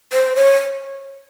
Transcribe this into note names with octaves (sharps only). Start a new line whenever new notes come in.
C5
C#5